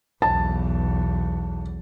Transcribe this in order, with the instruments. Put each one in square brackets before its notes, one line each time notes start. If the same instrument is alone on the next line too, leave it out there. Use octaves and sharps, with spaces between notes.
[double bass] B1 E2 [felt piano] A5